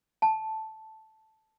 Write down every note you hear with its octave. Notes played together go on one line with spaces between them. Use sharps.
A5